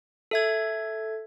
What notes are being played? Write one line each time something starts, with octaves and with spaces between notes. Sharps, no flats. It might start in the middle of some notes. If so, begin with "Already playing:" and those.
A4 E5 G#6